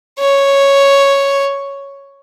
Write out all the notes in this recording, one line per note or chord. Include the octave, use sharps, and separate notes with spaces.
C#5